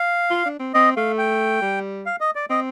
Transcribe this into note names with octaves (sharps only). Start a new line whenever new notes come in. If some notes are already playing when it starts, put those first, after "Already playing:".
Already playing: F5
F4
D4
C4
C4 D#5
A3 F5
G5
G3
F5
D#5
D5
C4 D#5